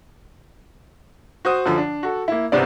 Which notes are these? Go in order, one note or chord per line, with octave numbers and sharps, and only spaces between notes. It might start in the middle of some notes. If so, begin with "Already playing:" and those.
F#4 C5 D#6
F#2 D3 F3
D4
F#4 A4
A#3 E4
G1 C2 C3 B3 C4 D5